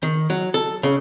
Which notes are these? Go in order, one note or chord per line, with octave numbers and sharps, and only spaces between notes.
D#3
F#3
A4
C#3